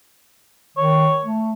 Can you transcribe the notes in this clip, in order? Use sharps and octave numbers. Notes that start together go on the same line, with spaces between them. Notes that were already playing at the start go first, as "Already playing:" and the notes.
D#3 C#5
A3